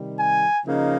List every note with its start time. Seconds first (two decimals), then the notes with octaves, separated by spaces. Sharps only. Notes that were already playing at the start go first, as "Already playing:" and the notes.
Already playing: C3 D#3 G3
0.20 G#5
0.65 C#3 F3 A#3 D#4